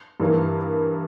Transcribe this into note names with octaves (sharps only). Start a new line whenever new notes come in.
G2 E3 A#3